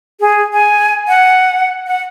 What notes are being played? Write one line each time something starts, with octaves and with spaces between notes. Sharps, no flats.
G#4
G#5
F#5
F#5